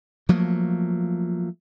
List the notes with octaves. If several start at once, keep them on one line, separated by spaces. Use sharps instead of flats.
F3 F#3 A3 A#3